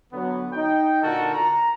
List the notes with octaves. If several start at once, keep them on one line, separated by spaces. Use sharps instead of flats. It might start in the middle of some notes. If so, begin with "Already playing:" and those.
D3 F#3 B3
D#4 G5
A#2 D3 F#4 A4 A#4
A#5